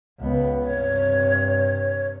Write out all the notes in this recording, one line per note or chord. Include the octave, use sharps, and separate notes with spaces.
C#2 B3
G2 C3 C#5